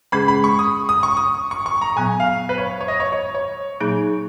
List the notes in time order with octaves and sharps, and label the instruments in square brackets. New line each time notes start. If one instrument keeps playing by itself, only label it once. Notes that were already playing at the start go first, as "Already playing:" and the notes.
[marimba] C#3 G#3 C#4 G#4 [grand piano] B5
[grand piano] B5
C#6
D#6
D#6
C#6
D#6
C#6
C#6
A#5
[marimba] A#2 F#3 B3 [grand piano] G#5
[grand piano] F5
B4
C#5
C#5
D#5
C#5
C#5
C#5
[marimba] A#2 F#3 A#3 D#4 G#4